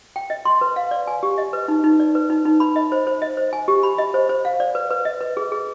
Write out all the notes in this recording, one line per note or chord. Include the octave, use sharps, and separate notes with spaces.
G5
D#5
C6
B4
F5
D5
G#5
G4
D#5
B4
D#4
D#4
D5
B4
D#4
D#4
B5
D#5
C5
C5
D#5
C5
G#5
G4
B5
D#5
C5
C5
F5
D5
B4
B4
D#5
B4
G#4
G#4